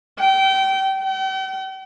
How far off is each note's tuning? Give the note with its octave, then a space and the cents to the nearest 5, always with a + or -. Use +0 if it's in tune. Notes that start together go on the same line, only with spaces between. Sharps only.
G5 -25
G5 -45